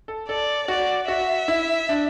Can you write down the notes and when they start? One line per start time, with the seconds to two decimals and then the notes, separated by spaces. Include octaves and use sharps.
0.08 A4
0.28 A4 D5
0.68 F#4 D5
1.08 F#4 E5
1.48 E4
1.89 D4